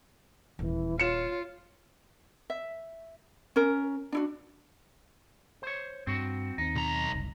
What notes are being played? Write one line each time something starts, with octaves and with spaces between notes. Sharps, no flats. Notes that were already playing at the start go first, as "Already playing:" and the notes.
D#1 E3
F4 C#5 C#7 E7
E5
C#4 A#4
D4 E4 F#4
C5 C#5
G2 C4 F#4
D#2 C4 D#4
B1 A#5
F#1 C2